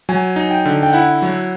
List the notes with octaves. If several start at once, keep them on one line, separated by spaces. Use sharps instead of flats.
F#3 G#5
D#4
G5
D3
G5
E4 F#5
F#3